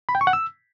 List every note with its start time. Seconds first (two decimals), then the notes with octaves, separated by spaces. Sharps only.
0.09 B5
0.15 G5
0.21 C#6
0.27 F#5
0.33 E6